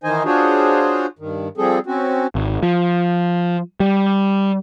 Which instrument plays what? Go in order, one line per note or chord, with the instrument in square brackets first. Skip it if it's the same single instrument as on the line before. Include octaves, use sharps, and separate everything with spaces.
[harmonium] D#3 E3 D#4 C5 D#5 G#5
D4 F4 F#4 G#4 C5 C#5
G2 D#3
F3 G3 C4 G#4 A4
C4 C#4 F#4
[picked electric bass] G#1
F3
G3